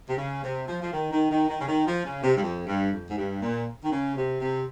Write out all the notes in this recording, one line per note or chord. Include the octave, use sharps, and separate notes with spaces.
C3
C#3
C3
F3
F3
D#3
D#3
D#3
D#3
C#3
D#3
F3
C#3
C3
G2
F2
G2
F2
G#2
G2
A#2
D#3
C#3
C3
C3